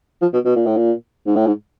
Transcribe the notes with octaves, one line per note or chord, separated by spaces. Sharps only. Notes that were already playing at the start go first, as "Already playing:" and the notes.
F3
B2
B2
A#2
A2
A#2
G#2
A2
G#2